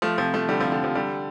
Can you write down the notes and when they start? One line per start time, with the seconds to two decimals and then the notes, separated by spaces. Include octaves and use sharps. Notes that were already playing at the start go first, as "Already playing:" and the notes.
0.02 F3 A3
0.18 C3 F3
0.34 F3 A3
0.49 D3 G3
0.60 C3 F3
0.72 D3
0.84 C3 F3
0.95 D3 G3